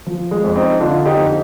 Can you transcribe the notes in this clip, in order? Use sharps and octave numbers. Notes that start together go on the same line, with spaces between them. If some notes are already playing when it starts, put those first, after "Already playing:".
F3
G#3
F2
C4 D#4
D3 D4 F4
D#4 G4
F2